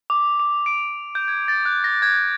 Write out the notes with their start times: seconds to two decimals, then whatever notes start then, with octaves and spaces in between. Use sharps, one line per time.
0.10 D6
0.40 D6
0.66 D7
1.15 G6
1.28 G#6
1.48 A6
1.66 F#6
1.84 A#6
2.02 G#6